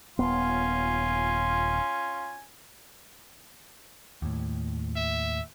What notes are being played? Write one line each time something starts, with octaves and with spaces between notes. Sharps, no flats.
D#1 B3 C#4 F4 G#5
D#2 A2
E5